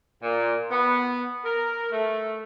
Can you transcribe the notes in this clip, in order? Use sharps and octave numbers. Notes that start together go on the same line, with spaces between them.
A#2
B3
A#4
A3